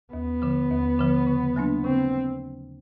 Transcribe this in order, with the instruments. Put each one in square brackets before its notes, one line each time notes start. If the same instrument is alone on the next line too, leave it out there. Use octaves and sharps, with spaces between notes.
[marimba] D#2 [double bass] B3
[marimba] D3 F3
D#2
D3 F3
C#3
F#3 A#3 D4
[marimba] C#3 [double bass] C4